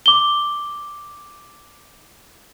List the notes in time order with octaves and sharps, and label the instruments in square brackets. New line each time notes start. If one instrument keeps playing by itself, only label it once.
[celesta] D6 G7